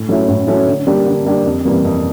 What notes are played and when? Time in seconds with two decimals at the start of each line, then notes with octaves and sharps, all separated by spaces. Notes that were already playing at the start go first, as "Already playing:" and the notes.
Already playing: A2
0.09 F#3 A3 C#4 E4
0.28 A2
0.47 F#3 A3 C#4 E4
0.67 D3
0.87 G3 A#3 D4 G4
1.06 D3
1.26 G3 A#3 D4 G4
1.45 F2
1.65 C3 E3 G3 A#3
1.85 F2